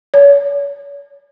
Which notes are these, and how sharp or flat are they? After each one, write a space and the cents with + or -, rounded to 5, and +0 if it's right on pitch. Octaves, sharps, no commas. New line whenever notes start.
C#5 +35